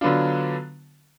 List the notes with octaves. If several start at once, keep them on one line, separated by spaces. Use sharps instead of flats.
D3 F#3 B3 D4 F4